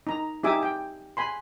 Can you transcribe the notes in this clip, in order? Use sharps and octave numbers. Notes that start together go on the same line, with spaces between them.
D#4 A#5
D#4 G4 E5 G#5 D6 D#6
G5
G#5 B5 C6